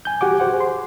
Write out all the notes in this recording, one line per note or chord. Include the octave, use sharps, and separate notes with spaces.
G#5 G6
F#4 G4 F#5 G#5 D6
G#4 C5 F#5
C6